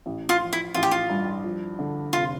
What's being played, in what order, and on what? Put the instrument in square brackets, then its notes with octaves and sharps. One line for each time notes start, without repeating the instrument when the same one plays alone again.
[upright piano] A1
[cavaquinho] F4
[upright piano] F3
[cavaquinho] E4
[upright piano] A1 [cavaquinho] F4
[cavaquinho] G4
F4
[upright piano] G2
F3
D3
[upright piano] F1 [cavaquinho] F4